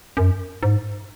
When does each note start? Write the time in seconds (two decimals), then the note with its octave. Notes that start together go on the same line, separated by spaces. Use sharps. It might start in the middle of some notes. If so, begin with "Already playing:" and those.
0.17 F#2
0.63 G#2